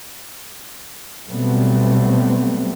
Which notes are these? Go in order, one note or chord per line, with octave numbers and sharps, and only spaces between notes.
B2 F#3 G3 A3 B3 C4